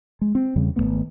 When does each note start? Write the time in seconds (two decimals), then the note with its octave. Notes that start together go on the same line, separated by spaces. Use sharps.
0.21 G#3
0.35 C4
0.56 E2 C#3 G3
0.76 G#1 A2 A3 B3